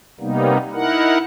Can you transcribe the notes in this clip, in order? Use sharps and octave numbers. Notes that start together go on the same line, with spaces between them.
C3 G3 A#3 B3 D#4
D#4 E4 A#4 F#5